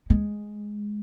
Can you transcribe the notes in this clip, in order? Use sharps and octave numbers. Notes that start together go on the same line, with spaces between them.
G#3